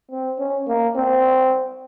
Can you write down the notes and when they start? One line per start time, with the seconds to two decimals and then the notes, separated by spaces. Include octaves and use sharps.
0.11 C4
0.39 C#4
0.68 A#3
0.95 C4